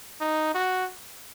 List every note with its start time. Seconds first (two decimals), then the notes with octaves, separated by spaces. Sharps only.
0.20 D#4
0.55 F#4